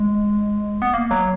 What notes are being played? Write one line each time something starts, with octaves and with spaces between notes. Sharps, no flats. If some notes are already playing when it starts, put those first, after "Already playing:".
Already playing: G#3
B3
A#3
F#3